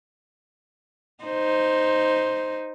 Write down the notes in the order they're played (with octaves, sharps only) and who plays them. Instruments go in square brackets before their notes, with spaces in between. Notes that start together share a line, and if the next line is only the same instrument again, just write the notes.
[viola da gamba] D#4 C5